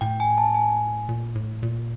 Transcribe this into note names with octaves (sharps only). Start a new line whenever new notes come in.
A2 G5
G#5
A5
G#5
A#2
A2
A#2